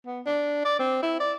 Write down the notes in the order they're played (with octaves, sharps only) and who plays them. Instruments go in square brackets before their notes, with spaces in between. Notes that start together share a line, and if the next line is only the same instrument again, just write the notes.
[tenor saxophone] B3
D4
D5
C4
E4
D5